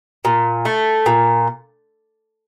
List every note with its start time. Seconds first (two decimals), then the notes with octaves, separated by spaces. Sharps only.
0.25 A#2
0.65 A3
1.06 A#2